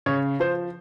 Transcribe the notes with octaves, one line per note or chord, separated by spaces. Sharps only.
C#3 C#5
F3 C5